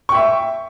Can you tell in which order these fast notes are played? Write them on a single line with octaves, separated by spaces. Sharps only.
C#6 G5 E5